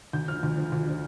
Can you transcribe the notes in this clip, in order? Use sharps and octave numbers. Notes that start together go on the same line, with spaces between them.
D2 G6
D3 F3 F6
D2
D3 F3
D2
D3 F3